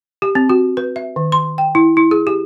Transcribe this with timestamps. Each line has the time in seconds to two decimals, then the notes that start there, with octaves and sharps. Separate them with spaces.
0.22 G4
0.35 C4
0.49 F#4
0.77 B4
0.96 E5
1.16 D#3
1.32 C6
1.58 G5
1.75 E4
1.97 E4
2.11 G#4
2.27 G4